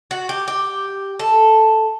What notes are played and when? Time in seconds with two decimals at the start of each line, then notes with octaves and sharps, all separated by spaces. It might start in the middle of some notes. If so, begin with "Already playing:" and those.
0.11 F#4
0.29 G4
0.48 G4
1.19 A4